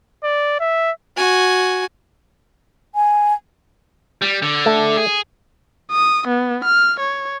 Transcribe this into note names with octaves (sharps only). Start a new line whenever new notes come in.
D5
E5
F#4 G#5
G#5
G3
D3
A3
G#4
D#6
B3
F6
C#5